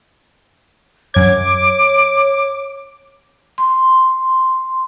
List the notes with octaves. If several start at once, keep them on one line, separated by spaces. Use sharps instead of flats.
F#2 C#5 D6 G#6
C6